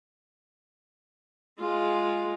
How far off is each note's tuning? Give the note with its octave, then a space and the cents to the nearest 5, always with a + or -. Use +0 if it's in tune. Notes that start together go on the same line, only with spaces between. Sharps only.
G#3 +0 F4 +0